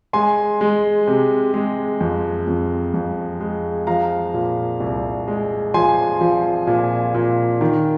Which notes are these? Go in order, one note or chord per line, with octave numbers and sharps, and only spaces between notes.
G#3 G#5 C6
G#3
C3
G#3
F2
F2
F2
G#3
F3 F5 A#5
A#2
C2
G#3
F3 G#5 C6
F3
A#2
A#2
D#3